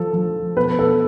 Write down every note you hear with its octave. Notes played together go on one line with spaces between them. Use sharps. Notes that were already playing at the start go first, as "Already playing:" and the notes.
Already playing: F3 A4
F3
B2 B4
A4